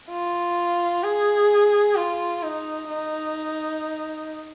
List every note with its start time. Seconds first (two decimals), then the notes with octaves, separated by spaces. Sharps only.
0.10 F4
1.03 G#4
1.96 F4
2.42 D#4
2.89 D#4